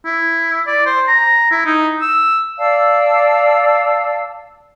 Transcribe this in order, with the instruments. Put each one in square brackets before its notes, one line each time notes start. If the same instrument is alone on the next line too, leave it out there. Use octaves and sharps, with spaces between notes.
[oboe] E4
D5
C5
A#5
E4
D#4
E6
[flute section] D5 F5 A5 E6